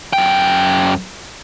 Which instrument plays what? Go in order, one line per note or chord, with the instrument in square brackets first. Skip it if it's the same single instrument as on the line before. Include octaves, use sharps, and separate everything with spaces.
[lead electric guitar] F#2 G5